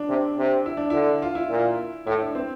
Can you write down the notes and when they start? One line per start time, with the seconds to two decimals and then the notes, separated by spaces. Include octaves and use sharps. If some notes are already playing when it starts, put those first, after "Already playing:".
Already playing: D4
0.09 C3
0.37 C3
0.66 E4
0.77 D4
0.90 D3 E4
1.22 F4
1.35 E4
1.50 A#2
2.06 A2 E4
2.21 D4
2.35 C4